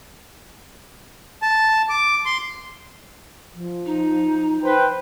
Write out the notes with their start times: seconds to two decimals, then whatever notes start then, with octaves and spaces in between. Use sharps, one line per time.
1.42 A5
1.89 D6
2.26 C6
3.54 F3
3.86 D#4
4.63 B4 C5 G5